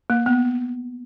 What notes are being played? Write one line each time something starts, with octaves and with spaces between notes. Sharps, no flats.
A#3
B3